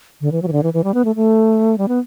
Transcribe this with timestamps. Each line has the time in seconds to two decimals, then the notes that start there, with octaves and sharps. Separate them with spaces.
0.21 D3
0.32 E3
0.42 F#3
0.48 E3
0.53 D3
0.63 E3
0.74 E3
0.84 G3
0.94 B3
1.05 A3
1.16 A3
1.78 G3
1.88 B3